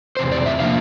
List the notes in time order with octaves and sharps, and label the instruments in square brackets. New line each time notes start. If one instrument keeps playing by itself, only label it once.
[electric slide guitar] E2 C3 C5
D5
E5
F3 A#3 D4 F5